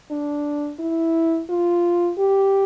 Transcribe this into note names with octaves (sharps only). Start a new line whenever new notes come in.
D4
E4
F4
G4